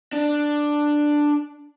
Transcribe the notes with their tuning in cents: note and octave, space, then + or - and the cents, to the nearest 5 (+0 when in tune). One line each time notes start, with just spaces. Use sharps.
D4 +5